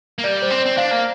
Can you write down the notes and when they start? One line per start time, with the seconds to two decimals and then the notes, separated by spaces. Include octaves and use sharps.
0.18 A#3
0.24 G3 D5
0.42 C5
0.50 C4
0.59 D5
0.66 C4
0.77 D4 F5
0.91 A#3